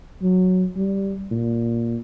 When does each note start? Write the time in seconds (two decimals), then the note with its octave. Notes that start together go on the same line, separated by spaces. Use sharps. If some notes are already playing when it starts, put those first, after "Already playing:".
0.22 F#3
0.76 G3
1.31 A#2